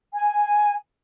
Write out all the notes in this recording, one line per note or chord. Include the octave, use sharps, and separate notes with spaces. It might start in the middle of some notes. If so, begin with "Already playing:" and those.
G#5